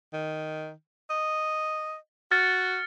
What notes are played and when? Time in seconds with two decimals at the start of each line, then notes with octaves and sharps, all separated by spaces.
0.13 D#3
1.10 D#5
2.31 F#4 F6 A6 C#7